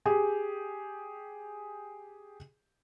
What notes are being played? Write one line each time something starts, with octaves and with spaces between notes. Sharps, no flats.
G4 G#4